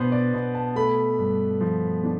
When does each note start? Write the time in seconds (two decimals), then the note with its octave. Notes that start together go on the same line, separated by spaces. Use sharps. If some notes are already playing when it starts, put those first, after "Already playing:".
Already playing: B2 B3 D4 B4 C5
0.12 D5
0.34 B2
0.55 A5
0.76 A3 B5
1.19 G2
1.61 F3
2.04 D4